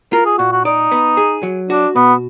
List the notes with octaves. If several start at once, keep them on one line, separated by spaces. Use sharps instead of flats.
F4 A#4
G#4
A#2 F#4
F#4
D#4 D5
B3
G#4
F#3
D4 F#4
B2 B3